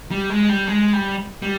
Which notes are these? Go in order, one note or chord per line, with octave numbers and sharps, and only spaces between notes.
G3
G#3
G3
G#3
G3
G3